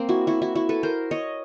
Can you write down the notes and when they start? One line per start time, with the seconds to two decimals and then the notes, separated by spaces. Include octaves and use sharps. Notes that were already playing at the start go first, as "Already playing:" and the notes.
Already playing: A#3 C4
0.09 E4 F#4
0.27 E4 F#4
0.42 E4 F#4
0.55 E4 F#4
0.69 A4 B4
0.83 A#4 C5
1.11 C#5 D#5